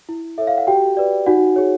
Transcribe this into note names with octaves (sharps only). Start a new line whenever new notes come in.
E4
A4 C#5 E5
F5
F#5
F#4 G4 G5
B4 D5
D#4 F#4 F#5
G#4 C#5